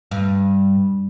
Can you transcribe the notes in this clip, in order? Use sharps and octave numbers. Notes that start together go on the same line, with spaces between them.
G2